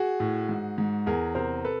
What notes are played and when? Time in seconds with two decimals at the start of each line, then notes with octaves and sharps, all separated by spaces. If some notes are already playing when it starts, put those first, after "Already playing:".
Already playing: F#4 G#4
0.20 A2
0.49 G#2
0.78 G#2
1.06 E2 G#4 A#4
1.35 C3 A#4 C5
1.65 A4 B4